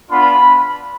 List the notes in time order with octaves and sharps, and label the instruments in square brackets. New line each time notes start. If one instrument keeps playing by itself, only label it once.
[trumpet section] B3 D4 F4 B5